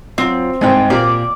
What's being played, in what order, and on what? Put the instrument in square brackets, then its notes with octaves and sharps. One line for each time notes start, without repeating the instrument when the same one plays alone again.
[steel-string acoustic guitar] F#3 F4 [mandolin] C4
[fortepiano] C2 G#2 [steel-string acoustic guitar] G#3 D#4 G5
[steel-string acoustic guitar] A#2 [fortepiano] A#3 C4 G4 [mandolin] D5